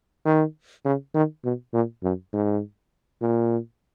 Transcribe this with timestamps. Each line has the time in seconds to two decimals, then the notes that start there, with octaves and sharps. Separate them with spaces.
0.25 D#3
0.85 C#3
1.15 D#3
1.44 B2
1.74 A#2
2.03 F#2
2.33 G#2
3.22 A#2